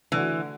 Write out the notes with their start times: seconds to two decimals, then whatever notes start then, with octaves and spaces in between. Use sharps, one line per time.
0.12 D3 E3 A3 D4 F#4